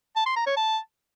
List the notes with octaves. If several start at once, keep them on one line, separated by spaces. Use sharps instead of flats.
A5
C6
A#5
C#5
A5